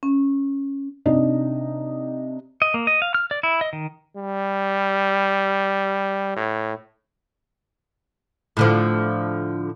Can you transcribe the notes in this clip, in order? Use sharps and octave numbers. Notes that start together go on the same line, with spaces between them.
C#4
C3 D4 D#4 D#5
D#5
A#3
D#5
F5
F6
D5
E4
D#5
D#3
G3
A2
A2 D3 F3